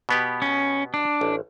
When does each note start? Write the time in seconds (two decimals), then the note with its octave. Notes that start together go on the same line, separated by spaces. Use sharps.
0.09 B2 B3 G4
0.42 C#4
0.94 D4
1.21 A1